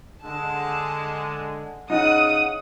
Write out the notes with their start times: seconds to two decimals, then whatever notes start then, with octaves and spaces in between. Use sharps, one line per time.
0.23 D3 G#3 A5
1.90 C#3 D#4 F#5 D#6 D#7